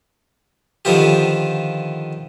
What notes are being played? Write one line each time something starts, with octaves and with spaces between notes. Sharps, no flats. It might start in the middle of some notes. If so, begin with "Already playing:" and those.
D3 D#3 F3 B3 F4 G4